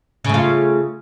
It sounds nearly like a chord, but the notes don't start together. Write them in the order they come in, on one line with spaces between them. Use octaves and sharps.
C#3 A3 F4